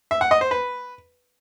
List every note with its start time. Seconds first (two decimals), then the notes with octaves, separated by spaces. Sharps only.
0.11 E5
0.21 F#5
0.31 D#5
0.41 C5
0.51 B4